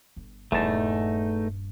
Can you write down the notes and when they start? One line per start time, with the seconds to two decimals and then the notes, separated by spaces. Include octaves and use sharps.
0.16 G1
0.52 D#1 E2 G2 A3 D#4 A5